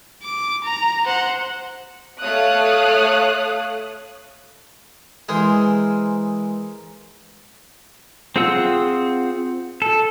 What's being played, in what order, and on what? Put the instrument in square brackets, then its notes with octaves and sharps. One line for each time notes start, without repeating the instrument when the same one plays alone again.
[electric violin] D6
A#5
C5 F#5
[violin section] A3 C#5 F5 D#6 F#6
[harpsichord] E3 G#3 [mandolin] G#4 A#4 C5
[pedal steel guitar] C4 F4 G#4 F#5 E6
A4